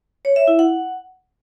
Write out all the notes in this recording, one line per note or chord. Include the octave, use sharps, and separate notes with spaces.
C#5
E5
E4
F#5